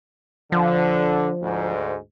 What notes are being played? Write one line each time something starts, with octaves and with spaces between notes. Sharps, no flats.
D3 F3
D2 G#2